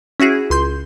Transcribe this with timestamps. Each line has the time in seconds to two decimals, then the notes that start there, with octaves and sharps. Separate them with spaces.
0.20 C#4 E4 F#4 G#4
0.50 C#2 C6 G6